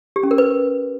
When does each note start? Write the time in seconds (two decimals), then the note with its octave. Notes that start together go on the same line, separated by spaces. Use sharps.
0.16 G4
0.23 C#4
0.31 A#4
0.38 B4